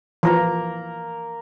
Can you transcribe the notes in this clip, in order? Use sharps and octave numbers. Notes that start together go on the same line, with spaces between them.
E3 F3 A#3 A#4 A#5